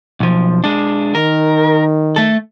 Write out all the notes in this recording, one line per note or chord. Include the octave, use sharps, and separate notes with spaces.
B1 F3
G#3 D4
D#3 A#4
A3 A4